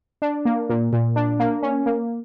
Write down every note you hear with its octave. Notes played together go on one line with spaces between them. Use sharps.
D4
A#3
A#2
A#2
D4
A#3
C#4
A#3